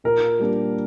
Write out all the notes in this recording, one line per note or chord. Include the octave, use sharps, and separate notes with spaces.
A#2 A#4
G3 A#3 D4